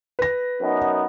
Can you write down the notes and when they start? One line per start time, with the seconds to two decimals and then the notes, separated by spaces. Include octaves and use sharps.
0.19 B4 A#6
0.61 F#2 B3 D#4